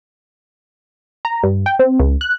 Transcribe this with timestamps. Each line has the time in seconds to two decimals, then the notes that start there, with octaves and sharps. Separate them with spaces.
1.25 A#5
1.43 G2
1.66 G5
1.79 C4
1.99 C#2
2.21 F#6